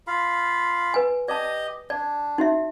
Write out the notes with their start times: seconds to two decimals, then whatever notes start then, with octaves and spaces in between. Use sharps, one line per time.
0.07 F4 F5 B5
0.94 B4 G#5
1.28 G4 D5 D#5 A5
1.90 D4 D5
2.38 D#4 F#4 E5